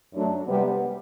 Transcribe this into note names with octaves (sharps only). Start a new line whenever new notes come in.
F#2 F#3 A3 D4
C3 G3 B3